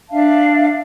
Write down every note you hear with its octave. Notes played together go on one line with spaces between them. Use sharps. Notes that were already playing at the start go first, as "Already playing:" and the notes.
D4 E5 F5 A5